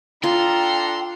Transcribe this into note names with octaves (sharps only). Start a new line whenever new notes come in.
D4 F4 A4 G5 A#5 C6